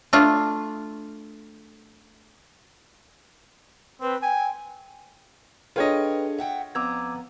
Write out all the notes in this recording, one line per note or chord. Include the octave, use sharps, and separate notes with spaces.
A3 D4 F4
C4 B4
G5 G#5
D4 F4 G#4 A4 B4 C#5 D#5 G5
E5 F#5 G5
F2 B3 A#5 D6 E6 G#6